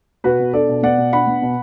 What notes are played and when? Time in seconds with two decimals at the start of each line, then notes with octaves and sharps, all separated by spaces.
0.24 B2 F#4 B4
0.40 B2
0.53 D4 A4 D5
0.69 B2
0.83 B3 D5 F#5
0.98 B2
1.13 D4 F#5 B5
1.27 B3
1.42 B2